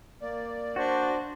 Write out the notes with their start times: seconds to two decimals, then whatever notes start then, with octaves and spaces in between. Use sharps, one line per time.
0.22 A#3 D5
0.76 D4 F#4 C5